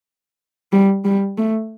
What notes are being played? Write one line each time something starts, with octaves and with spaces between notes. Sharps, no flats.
G3
G3
A3